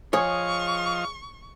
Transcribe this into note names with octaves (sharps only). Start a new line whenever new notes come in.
F3 G#4 C#5 D#5 F5 C#6